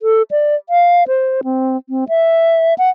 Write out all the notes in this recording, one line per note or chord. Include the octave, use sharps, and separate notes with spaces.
A4
D5
F5
C5
C4
C4
E5
F#5